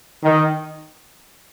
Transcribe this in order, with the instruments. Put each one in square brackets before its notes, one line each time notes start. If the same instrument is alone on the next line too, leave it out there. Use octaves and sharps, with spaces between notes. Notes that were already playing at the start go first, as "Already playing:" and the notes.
[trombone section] D#3